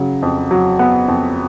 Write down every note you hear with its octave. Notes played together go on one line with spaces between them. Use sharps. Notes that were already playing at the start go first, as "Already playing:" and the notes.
Already playing: C#3 F#3
F2
F#3
B3
F2